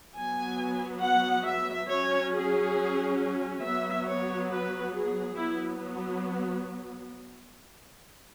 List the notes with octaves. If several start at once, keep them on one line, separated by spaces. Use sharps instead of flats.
F#3 B3 G#5
F#5
E5
F#3 C#4 C#5
G#4
F#3 B3 E5
C#5
B4
G#4
F#3 B3 E4